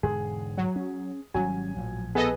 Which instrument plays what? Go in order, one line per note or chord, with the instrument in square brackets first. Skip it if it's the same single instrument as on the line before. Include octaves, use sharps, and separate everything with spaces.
[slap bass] E1 G#2 D3 [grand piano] G#4
[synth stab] F#3
[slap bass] C#4
[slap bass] G#1 G3 C#4 [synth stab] F#3 [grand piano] G#5
[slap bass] A#1 A2 F3
[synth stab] B3 A4 D#5 [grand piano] G#4 B4